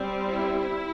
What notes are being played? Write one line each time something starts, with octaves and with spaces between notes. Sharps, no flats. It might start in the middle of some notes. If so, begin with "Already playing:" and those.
Already playing: G3 C4
E4